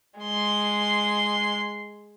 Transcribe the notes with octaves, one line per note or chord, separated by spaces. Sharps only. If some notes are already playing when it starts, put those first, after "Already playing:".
G#3 C6